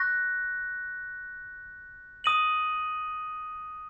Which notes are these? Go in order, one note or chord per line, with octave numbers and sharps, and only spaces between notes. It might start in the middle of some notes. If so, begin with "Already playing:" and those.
Already playing: C#6 F#6 A#6
D#6 A#6 D#7 F#7